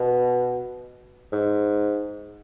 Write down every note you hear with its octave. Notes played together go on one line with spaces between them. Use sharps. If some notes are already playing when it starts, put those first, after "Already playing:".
Already playing: B2
G#2